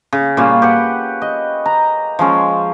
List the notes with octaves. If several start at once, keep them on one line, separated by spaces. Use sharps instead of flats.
C#3
A#2 G3 C#4 F4
G4 B4 F#5
D#5
A#5
F3 G#3 C#4